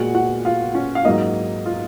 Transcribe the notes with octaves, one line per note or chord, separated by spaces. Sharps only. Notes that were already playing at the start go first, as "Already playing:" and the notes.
Already playing: A#2 G#3 F#4 F#5
F#4 F#5
F4 F5
C#4 C#5
F5
G#2 F#3 A#3 D#4 D#5
F4